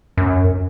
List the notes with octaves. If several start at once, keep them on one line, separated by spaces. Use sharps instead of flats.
F#2